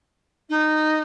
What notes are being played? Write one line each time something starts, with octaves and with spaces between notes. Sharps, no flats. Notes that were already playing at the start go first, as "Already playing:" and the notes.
D#4